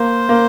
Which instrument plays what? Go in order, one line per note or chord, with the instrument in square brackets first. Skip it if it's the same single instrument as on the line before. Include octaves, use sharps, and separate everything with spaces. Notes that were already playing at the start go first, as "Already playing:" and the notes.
Already playing: [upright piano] A#3 [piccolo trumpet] C5
[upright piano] A#3